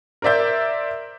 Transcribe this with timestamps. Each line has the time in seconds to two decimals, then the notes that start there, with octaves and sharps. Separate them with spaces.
0.22 A#4 C5 D5 E5 G6